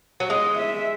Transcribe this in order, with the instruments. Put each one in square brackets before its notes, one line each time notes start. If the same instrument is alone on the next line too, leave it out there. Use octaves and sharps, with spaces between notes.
[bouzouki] F#3
[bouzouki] G#3 [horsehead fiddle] D#5
[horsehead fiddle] E5